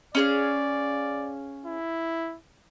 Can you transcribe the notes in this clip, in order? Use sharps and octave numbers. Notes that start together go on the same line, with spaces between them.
C#4 G#4 D5 F5
E4